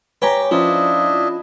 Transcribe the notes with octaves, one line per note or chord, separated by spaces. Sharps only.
G4 B4 C#5 G#5 A#5
F3 C#4 D4 E4 F4 D#5